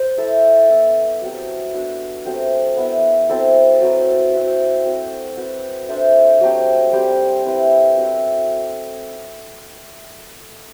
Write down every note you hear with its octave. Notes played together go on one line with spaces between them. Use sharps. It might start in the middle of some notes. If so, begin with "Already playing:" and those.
Already playing: C5
E4 A4 E5
B3 E4 A4
F#3 C4 G4
B3 D4 F#4
F#3 A3 C4 G4
B3 E4 B4 E5
F#3 C4 E4 A4
F#3 C4 E4 B4
C4 F#4 C5 E5
C4 F#4 A4
C4 F#4 B4
D4 A4 C5 E5
F#3 A3 C4 G4
G3 C4 G4 C5
C4 E4 B4 E5
C4 F#4 A4 E5